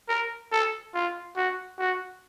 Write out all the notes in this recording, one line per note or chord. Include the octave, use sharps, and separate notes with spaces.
A#4
A4
F4
F#4
F#4